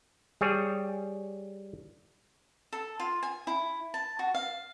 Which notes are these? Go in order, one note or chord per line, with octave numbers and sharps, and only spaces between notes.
G3 G#4 C#5
A4
F4
G#5
E4
A5
F#4
F5